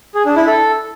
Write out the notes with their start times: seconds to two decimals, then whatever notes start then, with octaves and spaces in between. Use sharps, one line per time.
0.15 G#4
0.26 D4
0.36 E4
0.47 A4